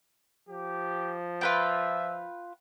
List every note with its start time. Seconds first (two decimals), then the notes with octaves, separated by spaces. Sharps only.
0.49 F3 G4
1.41 F4 B4 E5 G5